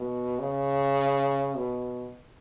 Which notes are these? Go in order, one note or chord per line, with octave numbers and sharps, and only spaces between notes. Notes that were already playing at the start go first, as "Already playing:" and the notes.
Already playing: B2
C#3
B2